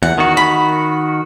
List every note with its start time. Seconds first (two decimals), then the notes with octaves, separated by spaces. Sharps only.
0.03 E2 F#5
0.18 D#3 F#4
0.37 B5